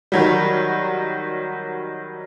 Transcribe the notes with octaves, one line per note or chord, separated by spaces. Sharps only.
D#3 F#3 G3